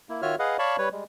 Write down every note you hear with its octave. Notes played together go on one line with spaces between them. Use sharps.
A#3 E4
D#3 F4 F#4 C#5 E5 F6
G#4 B4 D#5 F5 F#5
C#5 D5 F5 A5 B5 C#6
G3 B4 C#5
G3 G#3